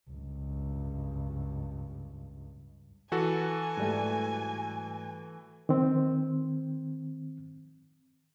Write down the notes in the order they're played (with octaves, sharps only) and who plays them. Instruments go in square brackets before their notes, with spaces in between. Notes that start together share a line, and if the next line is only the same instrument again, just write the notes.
[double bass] C#2 G2
[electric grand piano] E3 F#4 A4 [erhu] G#5
[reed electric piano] G#2 G3 A3
D#3 C4